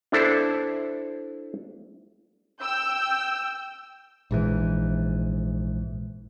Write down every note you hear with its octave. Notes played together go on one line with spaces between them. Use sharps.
D4 E4 A4 C5
G5 E6 G6
A#1 G#2 E3